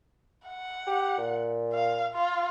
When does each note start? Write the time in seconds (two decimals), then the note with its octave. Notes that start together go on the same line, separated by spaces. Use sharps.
0.47 F#5
0.87 G4
1.18 A#2
1.73 F5
2.14 F4